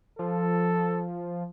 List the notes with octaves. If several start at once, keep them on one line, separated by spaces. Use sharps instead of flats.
F3 A4